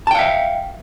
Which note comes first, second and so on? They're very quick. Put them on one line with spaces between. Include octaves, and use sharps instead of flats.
A5 G5 F5 E5